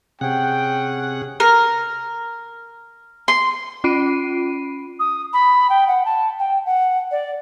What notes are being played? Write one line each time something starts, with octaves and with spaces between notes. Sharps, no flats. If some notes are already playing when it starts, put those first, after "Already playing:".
C3 C#4 G#4 F#5 G5
A#4
C6
C#4 F4 B5 C7 D7 D#7
D#6
B5
G5
F#5
A5
G5
F#5
D5